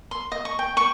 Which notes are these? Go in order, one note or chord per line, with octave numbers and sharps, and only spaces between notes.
C6
D#5
C#6
G5
C#6